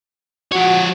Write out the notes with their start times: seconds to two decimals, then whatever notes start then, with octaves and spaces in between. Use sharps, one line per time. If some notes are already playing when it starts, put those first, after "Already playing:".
0.52 F3 F#4 C#5